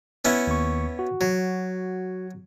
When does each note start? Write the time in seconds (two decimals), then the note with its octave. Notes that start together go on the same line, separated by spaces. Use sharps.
0.25 B3 C#4 E4
0.47 D#2 C#6
0.99 F#4
1.21 F#3